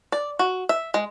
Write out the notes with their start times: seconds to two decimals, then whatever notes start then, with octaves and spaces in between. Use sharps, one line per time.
0.12 D5
0.39 F#4
0.69 E5
0.94 G#3